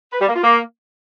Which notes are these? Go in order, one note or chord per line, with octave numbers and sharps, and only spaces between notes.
B4
G3
A#3
F4
A#3